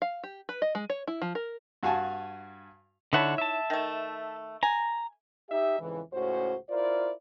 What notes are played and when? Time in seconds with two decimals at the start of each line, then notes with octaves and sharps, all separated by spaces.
0.02 F5
0.24 G4
0.49 B4
0.62 D#5
0.75 G#3
0.90 C#5
1.07 E4
1.22 F3
1.35 A#4
1.83 G2 F#4 F5 F#5 G#5 A5
3.13 D3 D#4 E4 C#5 F#5 A5
3.38 E5 A5
3.70 D#3 A3
4.63 G#5 A#5
5.50 D#4 G4 E5
5.80 F2 G#2 C#3 E3
6.13 C#2 A2 C#4 F#4 C5
6.69 E4 F4 A#4 C5 D5